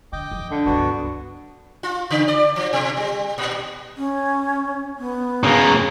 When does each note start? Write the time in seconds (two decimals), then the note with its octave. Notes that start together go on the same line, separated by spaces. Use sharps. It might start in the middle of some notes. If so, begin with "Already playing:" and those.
0.13 D3 D#5 G5 D6
0.31 F3
0.51 D3
0.66 G1 C#2 B3 D4 F#4
1.83 F4
2.11 C#3
2.28 D5
2.56 F3
2.73 B2
2.97 G3
3.38 A#2
3.98 C#4
4.98 B3
5.44 C#3 A#3